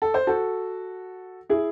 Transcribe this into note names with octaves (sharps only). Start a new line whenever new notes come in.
A4
C5
F#4 A4
E4 G#4